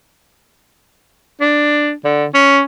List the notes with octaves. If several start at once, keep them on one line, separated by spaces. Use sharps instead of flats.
D4
D3
C#4